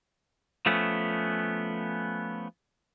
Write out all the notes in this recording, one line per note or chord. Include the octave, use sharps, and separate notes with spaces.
F3 A3 B3 C#4